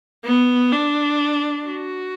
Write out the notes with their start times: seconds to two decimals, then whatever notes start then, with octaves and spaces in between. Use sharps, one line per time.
0.25 B3
0.72 D4
1.66 F#4